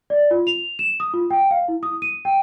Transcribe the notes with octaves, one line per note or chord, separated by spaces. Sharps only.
D5
F4
F7
E7
D#6
F4
G5
F5
E4
D#6
D#7
G5